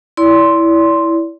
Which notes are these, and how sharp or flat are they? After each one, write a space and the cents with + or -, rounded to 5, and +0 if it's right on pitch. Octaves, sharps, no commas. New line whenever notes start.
E4 +0 D5 -35 C6 +0